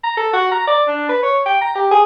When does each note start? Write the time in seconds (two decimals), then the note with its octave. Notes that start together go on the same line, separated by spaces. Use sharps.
0.04 A#5
0.17 A4
0.33 F#4
0.52 A#5
0.67 D5
0.88 D4
1.09 B4
1.23 C#5
1.46 G5
1.61 A#5
1.76 G4
1.91 G#4